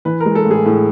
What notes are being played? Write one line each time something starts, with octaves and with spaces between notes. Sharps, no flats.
E3 B4
A#4
G#3
A4
A2
G#4
A2